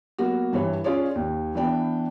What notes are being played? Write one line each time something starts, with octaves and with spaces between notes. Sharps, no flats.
F#3 A#3 B3 F#4
G2 E3 C#5
C#4 F4 G#4 C#5 D5
D#2
E3 B3 D4 G5